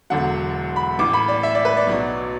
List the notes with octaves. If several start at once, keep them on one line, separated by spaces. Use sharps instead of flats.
E1 E2 D3 F#3 F#5
B5
A1 A2 E3 D6
B5
D5
E5
D5
B4
D5
B1 B2 F#3